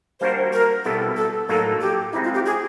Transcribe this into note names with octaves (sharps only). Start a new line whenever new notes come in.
G3 A#3 D4 F#4 A#4 C5
A#4
B2 G3 B3 E4 A4
A4
A2 F#3 A#3 D#4 A4
G4
G#3 C4 D#4 E4
F4
G4
G#4